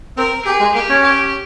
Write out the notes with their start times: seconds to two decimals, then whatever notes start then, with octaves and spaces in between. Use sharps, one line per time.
0.17 C4 A#4
0.45 G4 G#4
0.60 G#3
0.74 A#3 G4
0.89 C#4
1.03 G4